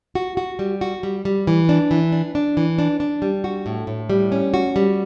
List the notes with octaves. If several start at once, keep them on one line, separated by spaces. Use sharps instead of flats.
F#4
F#4
G3
F#4
G3
G3
E3
D4
E3
D4
D4
E3
D4
D4
G3
F#4
A2
A2
G3
C#4
F#4
G3